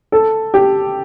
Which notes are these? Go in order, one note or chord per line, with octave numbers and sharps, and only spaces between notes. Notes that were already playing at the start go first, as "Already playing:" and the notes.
A4
G4